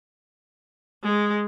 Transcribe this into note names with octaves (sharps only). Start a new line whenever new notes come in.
G#3